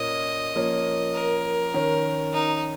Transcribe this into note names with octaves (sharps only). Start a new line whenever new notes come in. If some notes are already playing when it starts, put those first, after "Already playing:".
Already playing: A#2 A#3 C#4 D#5
F3 A#3 C#4
A#4
D#3 C#4
D#4